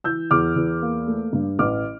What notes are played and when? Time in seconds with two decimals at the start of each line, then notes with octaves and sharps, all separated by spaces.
0.04 E3 E6 G6
0.31 E2 D6 F6
0.56 E2
0.82 A#3
1.07 A3
1.33 G2
1.59 A1 D6 F6